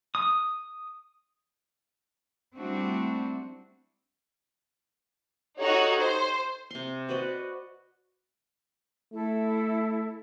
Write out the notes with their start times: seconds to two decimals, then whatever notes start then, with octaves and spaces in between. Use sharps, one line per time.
0.15 D#6
2.56 G3 A3 C4 D4 E4 F#4
5.59 D#4 F#4 G4 A4 C#5
5.99 C5
6.70 C3 C6
7.09 F#4 B4 C5 D5 D#5
9.13 A3 E4 A4